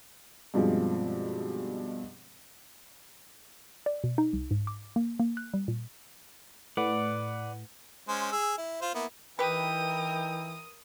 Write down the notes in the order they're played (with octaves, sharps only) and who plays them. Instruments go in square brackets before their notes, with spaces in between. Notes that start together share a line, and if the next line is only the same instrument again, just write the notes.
[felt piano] G2 B2 F3 G#3 C4
[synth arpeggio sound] D5
B2
D#4
C2
G#2
D6
A#3
A#3
F#6
G3
A#2
[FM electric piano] A2 [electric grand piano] B4 F#5 [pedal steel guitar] D5
[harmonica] G#3 C#4 C5
G#4 E6
E4
F4 C5
A#3 B3 E4
[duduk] E3 [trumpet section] D#4 E4 G5 [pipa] G4 B4 [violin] A#4 D#6